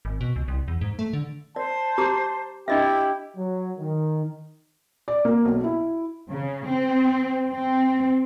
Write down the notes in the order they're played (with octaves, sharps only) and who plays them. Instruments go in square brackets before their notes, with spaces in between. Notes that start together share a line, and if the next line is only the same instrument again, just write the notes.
[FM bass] G#1
B2
C#2
C2
E2
G#2
A3
D3
[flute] C5 [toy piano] D5 [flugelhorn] A5
[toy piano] G4 A#5 D6
[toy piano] D4 D#5 E5 [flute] E4 [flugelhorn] G4
[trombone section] F#3
D#3
[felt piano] D5
A#3
B1
E4
[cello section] C#3
C4
C4